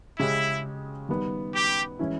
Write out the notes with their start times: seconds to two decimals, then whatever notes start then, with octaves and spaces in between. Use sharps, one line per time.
0.19 C#3 G#3 C#4 E4 G4
1.09 D#3 G3 B3
1.54 G4
1.99 E3 G#3 C#4 E4